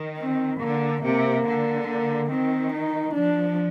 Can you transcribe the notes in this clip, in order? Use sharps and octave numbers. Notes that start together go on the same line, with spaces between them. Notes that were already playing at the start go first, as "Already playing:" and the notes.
Already playing: D#3
C4
D3 A#3
C3 A#3
D3
A#3
D#3 C4
D#4
F3 D4